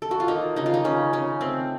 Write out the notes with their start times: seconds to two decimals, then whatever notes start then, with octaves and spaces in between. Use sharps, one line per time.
0.02 A4
0.11 F#4
0.20 F4
0.28 A#3 D#4
0.56 C#3 D#4
0.66 F4
0.74 D#4
0.84 C#3 C#4
1.13 C#3 C#4
1.41 A3 C4